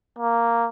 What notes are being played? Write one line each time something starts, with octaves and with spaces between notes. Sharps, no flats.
A#3